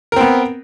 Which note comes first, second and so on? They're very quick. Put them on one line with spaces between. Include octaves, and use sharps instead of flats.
A#4 C4 B3